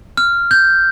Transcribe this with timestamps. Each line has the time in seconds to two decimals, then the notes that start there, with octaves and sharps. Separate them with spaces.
0.17 F6
0.51 G6